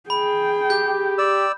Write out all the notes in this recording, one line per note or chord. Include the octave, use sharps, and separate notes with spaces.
G#4 G5 B5
G4 G6
D5 E6